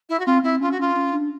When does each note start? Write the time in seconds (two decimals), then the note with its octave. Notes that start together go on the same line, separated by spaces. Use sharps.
0.09 E4
0.19 F#4
0.26 C4 F4
0.43 C4 E4
0.60 C#4 F4
0.71 F#4
0.79 C#4 F4
0.96 C#4
1.13 D4